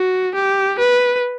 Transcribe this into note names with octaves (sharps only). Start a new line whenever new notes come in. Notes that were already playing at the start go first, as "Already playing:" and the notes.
Already playing: F#4
G4
B4